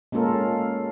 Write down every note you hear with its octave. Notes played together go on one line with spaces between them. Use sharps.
G#3 A#3 C#4 F4 A4 A#4